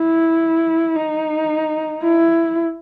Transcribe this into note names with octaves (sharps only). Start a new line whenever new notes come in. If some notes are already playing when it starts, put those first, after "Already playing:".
Already playing: E4
D#4
E4